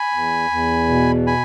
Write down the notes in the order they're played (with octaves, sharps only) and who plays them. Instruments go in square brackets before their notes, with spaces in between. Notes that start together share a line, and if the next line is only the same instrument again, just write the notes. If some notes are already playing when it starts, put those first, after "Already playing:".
Already playing: [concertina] G#5 B5
[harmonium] E2
E2
B2
[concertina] G#5 B5